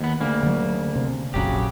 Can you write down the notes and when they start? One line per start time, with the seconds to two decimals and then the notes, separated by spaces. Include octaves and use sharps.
0.01 D#2 B3
0.20 D2 C#3 A#3
0.43 D3 F#3
0.96 C3
1.34 F1 A#1 C#3 F#3 G4